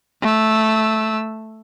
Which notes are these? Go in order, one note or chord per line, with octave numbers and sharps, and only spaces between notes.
A3 E6